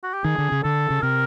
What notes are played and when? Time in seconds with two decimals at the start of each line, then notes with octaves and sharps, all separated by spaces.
0.03 F#4
0.14 G4
0.24 D#3 G#4
0.38 D3
0.52 C#3
0.63 D3 A4
0.90 C#3
1.02 C3 A#4